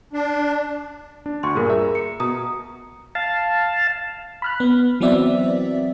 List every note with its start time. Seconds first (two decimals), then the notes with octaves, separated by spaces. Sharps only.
0.13 D4
1.26 D4
1.43 D2 C6 C#6
1.55 G2 A#2 G#4 A#4
1.70 E5 A#5
1.95 C#7
2.20 B2 A#5 D#6
3.15 F5 A5
4.42 B5 F6 F#6
4.60 B3
5.00 E3 F#3 B3 C4 D5 E5